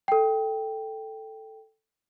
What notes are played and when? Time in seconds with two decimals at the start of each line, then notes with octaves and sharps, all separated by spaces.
0.08 A4 G5